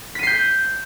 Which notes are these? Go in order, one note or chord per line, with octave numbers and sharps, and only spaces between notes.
G6 B6 C7 D#7